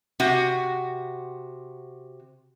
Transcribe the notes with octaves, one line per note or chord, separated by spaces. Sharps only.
C3 F#4